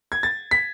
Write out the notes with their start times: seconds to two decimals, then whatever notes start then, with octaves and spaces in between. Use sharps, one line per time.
0.12 G#6
0.23 A6
0.51 B6